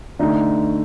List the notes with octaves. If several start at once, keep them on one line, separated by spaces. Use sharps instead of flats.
D3 A3 D#4